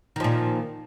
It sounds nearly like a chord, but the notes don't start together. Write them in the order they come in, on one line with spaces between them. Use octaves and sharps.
D#3 F3 A#2